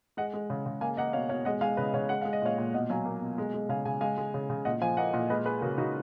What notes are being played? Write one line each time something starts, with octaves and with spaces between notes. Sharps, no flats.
G#3 D#5 F#5
G#3
C#3
C#3
A#3 F5 G#5
A#3 D#5 F#5
B2 C#5 F5
B2 C#5 F5
G#3 D#5 F#5
G#3 F5 G#5
C#3 B4 D#5
C#3 C#5 F5
G#3 F#5
G#3 F5
D#5
A#2 C#5 F5
A#2
B2 D#5 F#5
F#3 F5 G#5
A#3
B2
G#3
G#3
C#3 F5 G#5
C#3 G#5
G#3 F5 G#5
G#3
C#3
C#3
A#2 D#5 F#5
F3 F5 G#5
A#3 D#5 F#5
A#2 D#5 F#5
G#3 B4 D#5
G#3 G#4 B4
C#3 F#4 A#4
C#3 D#4 F#4